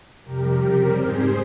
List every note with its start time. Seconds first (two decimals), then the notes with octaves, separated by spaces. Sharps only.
0.24 F2 C3 G3 G4 A#4
0.61 C#3 G3 C4 G4 A#4
0.96 G#2 G3 C4 G#4 C5